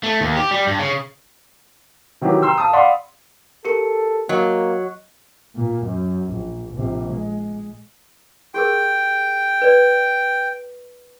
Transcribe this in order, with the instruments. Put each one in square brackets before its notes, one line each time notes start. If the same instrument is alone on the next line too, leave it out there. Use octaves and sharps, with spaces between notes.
[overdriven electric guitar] A3
D#2
G4
G3
G2
C#3
[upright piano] C3 D#3 E3 F#3 G4
G5 A#5 C6 E6
F5 A5 D#6
D5 F5 F#5 B5 C6
[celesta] G4 A#4 C#7 [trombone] A4
[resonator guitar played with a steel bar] F#3 [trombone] A#3 [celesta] D#5
[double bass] A#2
F#2
A#1
A#1 C3
G#3
[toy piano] G4 G#4 A#4 [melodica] G5
[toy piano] B4 D5